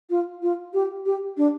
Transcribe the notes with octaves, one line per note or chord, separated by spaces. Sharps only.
F4
F4
G4
G4
D4